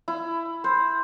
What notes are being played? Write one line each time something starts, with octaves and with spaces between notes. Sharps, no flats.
E4
C5